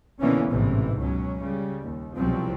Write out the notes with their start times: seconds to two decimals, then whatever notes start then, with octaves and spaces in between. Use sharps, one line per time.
0.20 B2 D3 E3 A#3 B3 C#4
0.50 A1 G#2 C3 E3
0.97 C#2 B2 F#3 C#4
1.40 C#3 G3
1.81 D#2
2.16 C2 B2 F3 F#3 C4